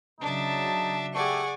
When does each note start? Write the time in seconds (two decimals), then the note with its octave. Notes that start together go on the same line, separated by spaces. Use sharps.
0.21 C#3 F#3 D4 D#4 E5 A5
1.15 A3 G4 G#4 D5 F#5 G#5 C#6